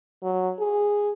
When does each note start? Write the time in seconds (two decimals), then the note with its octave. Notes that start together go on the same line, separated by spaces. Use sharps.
0.23 F#3
0.60 G#4